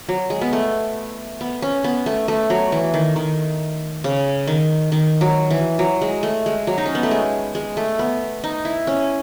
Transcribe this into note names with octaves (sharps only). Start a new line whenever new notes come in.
F#3
G#3
B3
A3
B3
C#4
B3
A3
A3
F#3
E3
D#3
D#3
C#3
D#3
D#3
F#3
E3
F#3
G#3
A3
G#3
F#3
D#4
C#4
B3
A3
G#3
G#3
A3
B3
D#4
E4
C#4